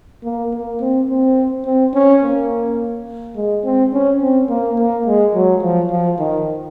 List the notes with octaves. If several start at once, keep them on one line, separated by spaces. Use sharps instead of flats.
A#3
A#3
C4
C4
C4
C#4
A#3
G#3
C4
C#4
C4
A#3
A#3
G#3
F#3
F3
F3
D#3